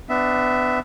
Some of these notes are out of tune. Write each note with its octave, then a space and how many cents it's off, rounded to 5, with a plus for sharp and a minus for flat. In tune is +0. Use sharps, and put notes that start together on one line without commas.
B3 +30 D4 +15 E5 +0